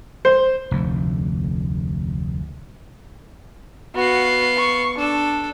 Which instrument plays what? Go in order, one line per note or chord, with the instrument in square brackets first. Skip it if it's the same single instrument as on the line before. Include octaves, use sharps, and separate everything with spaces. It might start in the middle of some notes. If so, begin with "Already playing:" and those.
[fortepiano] C5
[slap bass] F1 D2
[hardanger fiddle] B3 F5 [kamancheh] F#4
[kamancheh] C#6
[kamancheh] D4 [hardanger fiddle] A4